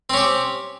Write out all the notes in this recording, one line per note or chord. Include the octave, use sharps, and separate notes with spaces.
C4 C#4 G4